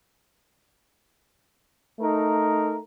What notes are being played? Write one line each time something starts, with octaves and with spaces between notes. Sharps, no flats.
A3 D#4 A#4